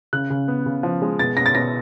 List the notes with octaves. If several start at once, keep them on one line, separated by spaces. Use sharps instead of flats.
C#3 F#6
C#3
B3
C#3
F3
G#3
B2 A6
B2 A#6
A6
B2 A#6